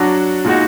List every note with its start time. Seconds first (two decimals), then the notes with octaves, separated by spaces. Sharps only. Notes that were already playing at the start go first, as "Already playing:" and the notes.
Already playing: F#3 D4 F#4
0.44 A#2 G#3 D#4 F#4